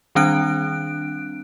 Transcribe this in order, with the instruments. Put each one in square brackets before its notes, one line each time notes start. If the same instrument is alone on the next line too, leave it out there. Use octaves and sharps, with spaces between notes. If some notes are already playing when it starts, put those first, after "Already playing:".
[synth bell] D#3 G3 C4 D4 F#6 D7